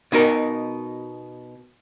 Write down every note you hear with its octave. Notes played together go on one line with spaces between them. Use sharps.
B2 D#4 A#4